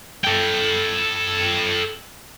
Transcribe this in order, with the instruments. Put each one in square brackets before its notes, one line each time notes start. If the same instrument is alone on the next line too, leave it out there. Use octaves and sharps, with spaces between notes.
[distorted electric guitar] A4 G5